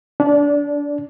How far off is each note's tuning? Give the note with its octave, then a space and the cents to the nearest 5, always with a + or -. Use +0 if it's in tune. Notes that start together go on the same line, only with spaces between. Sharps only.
D4 -25 D5 -5